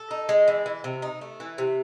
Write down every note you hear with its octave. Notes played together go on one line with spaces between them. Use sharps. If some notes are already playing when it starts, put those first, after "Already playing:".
Already playing: A4
D#4
G#3
E3
E3
C3
D#4
A3
E3
C3